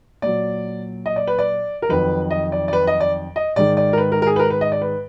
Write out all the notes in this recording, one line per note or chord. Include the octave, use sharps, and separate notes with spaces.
A#2 F#3 D5
D#5
D5
B4
D5
A#4
F2 D#3 F#3 B4
D#5
D5
D5
B4
D#5
D5
D#5
G#2 D#3 G#3 D5
D5
A#4
B4
A#4
A#4
G#4
B4
A#4
B4
D#5
D5
B4